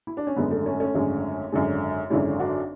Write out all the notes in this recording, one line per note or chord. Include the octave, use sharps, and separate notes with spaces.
E4
D4
C#4
G#1 F#2 D3 G#3 B3
A3
A3 C#4
A3 C#4
G#1 F#2 D3 G#3
G#1 F#2 D3 G#3
G#1 F#2 D3 G#3 C#4 E4
D4 F#4